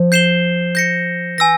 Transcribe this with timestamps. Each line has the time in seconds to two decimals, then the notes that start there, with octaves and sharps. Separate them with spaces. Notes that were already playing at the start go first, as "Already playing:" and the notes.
Already playing: F3
0.12 G6 C7 E7 G7
0.75 G6 A#6 C#7
1.38 E3 G#5 E6 A#6